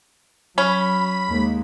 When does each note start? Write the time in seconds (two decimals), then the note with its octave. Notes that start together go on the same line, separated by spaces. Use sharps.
0.58 F#3 C#4 B5
1.30 D#2 G#3 A#3